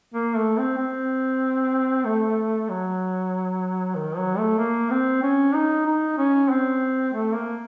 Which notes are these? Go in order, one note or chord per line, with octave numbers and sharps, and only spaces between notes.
A#3
A3
C4
C4
A3
F#3
D#3
F#3
A3
A#3
C4
C#4
D#4
D#4
C#4
C4
A3
A#3